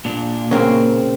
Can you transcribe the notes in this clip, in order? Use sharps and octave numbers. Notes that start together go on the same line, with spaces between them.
A#2 D4
C#3 A#3 C4